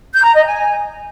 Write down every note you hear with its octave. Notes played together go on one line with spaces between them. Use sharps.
G6
A#5
D#5
G#5